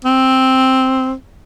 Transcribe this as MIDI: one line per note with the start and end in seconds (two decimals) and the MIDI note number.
0.05 1.13 60